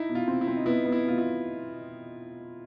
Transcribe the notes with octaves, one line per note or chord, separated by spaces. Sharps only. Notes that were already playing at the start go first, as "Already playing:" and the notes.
Already playing: D#4 E4
B2
F4
C4
E4
C4
D#4
B3 E4
B3
E4
B2 F4
E4